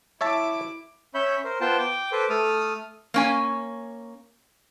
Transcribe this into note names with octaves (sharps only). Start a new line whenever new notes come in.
E4 C#5 E5 A5 D6
C#4 C#5 E5 B5 G6
A#4 C5
B3 F4 C5 G5 A5
G5 D6
A4 B4 C5 D6
A3 A4 D#6 F6
A#3 C#4 G#5